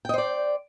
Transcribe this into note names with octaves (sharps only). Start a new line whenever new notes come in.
C5 D5 D#5 G5